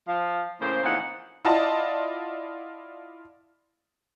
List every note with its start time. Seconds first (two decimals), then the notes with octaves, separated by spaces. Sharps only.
0.08 F3 F5
0.61 A2 C#3 A#3 C5
0.83 F2 A#2 C#3 E3 D#4 F#5
1.45 E4 F4 D5 D#5 F#5 A5